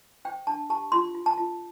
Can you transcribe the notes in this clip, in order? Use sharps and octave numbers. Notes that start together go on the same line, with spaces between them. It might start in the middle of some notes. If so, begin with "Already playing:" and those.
C5 G5
D4 A5
G4 A5
F4 C6
F4
A5
F4